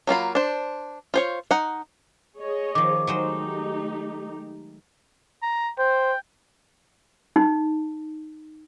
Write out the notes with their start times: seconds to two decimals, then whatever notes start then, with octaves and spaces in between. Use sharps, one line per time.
0.07 F#3 A#3 F4 B5
0.35 D4 C5
1.14 F4 C5 C#5
1.51 D#4 F#5
2.37 G#4 C#5 D#5
2.75 D#3 F3 D6
3.07 F#3 G#3 A3 D#4 G4 C5
5.42 A#5
5.78 C5 G5
7.36 D#4